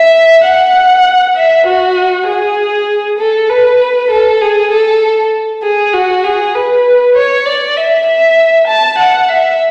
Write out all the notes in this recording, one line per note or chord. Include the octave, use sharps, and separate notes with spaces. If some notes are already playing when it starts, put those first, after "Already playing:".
Already playing: E5
F#5
E5
F#4
G#4
A4
B4
A4
G#4
A4
G#4
F#4
G#4
B4
C#5
D5
E5
E5
A5
F#5
E5